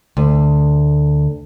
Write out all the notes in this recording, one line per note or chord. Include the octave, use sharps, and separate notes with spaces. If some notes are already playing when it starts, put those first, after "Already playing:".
D2